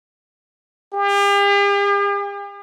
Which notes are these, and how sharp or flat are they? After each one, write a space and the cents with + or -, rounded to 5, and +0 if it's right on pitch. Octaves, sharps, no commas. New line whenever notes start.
G4 +45